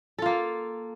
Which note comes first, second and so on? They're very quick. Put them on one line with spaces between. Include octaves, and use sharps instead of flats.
A4 F4 A#3